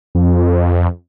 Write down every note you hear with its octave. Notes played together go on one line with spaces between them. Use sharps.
F2